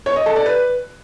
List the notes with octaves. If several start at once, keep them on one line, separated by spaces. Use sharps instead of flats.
C#5
D#5
A4
D5
B4